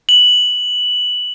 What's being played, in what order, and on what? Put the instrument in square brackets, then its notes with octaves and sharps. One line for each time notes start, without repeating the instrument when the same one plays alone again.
[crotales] F#7